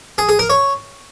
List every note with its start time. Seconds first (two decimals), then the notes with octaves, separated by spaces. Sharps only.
0.18 G#4
0.29 G#4
0.39 A#4
0.50 C#5